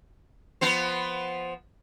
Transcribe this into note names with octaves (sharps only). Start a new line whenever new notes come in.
F3 B3 C5